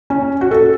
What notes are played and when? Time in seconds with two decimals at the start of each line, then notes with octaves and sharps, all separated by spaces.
0.10 C#4
0.41 F#4
0.51 A4